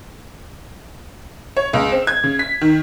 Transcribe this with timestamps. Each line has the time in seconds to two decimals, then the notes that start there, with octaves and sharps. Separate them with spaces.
1.57 C#5
1.73 C#2
1.92 C4
2.07 G#6
2.24 C#3
2.39 B6
2.61 D#3